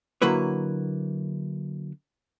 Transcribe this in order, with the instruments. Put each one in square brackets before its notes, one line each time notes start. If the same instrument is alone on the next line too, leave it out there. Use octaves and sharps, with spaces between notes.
[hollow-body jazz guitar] D3 F#3 A#3 E4 B4 C#5